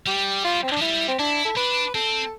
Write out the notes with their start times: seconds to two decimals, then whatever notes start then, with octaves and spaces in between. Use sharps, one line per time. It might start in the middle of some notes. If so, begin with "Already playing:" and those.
0.06 G3 G4
0.45 F4
0.63 C4
0.72 D4
0.77 F3
0.81 G3 E4
1.08 C4
1.19 D4 E4
1.45 A4
1.56 D4 B4
1.95 C4 A4